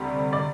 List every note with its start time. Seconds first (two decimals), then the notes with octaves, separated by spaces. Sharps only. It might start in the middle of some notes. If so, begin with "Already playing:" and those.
Already playing: D2 C3 G3
0.33 D5